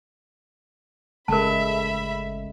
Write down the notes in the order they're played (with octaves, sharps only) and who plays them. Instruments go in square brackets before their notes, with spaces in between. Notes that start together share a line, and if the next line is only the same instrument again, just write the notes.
[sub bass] G1 [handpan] C#3 G#3 A3 [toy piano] A#4 A5 [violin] E5 B5